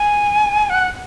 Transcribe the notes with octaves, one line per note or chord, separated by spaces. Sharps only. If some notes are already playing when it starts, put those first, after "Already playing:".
Already playing: G#5
F#5